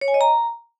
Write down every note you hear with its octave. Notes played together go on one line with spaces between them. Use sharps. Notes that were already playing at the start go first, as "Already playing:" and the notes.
C#5
G#5
D#5
A#5